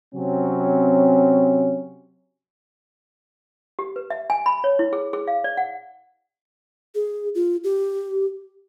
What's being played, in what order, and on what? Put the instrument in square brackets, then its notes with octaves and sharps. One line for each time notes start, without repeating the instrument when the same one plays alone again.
[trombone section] C3 F#3 C4 C#4
[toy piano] G4
B4
E5
G#5
B5
C#5
E4
G#4
G#4
F5
D5
F#5
[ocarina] G#4
F4
G4